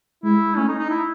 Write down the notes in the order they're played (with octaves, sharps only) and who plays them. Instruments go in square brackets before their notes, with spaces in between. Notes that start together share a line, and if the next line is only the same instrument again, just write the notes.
[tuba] G#3 [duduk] E4
[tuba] A3 [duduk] C#4
[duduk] D#4
D#4
E4